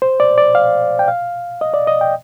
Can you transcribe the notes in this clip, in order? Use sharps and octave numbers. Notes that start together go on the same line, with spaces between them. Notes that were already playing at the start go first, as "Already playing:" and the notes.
C5
D5
D5
F5
G5
F5
D#5
D5
D#5
G5